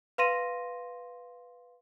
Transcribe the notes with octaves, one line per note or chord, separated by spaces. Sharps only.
B4 F5 C6 A#6 D#7